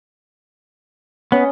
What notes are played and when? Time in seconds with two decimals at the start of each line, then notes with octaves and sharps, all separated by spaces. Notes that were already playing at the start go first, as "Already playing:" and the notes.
1.32 B3 C#4 D#5